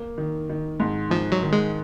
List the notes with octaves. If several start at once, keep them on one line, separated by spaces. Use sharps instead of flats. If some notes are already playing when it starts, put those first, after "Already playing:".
Already playing: A#3
D#3
D#3
G#2
G#2 F3
F#3
D#3
G#3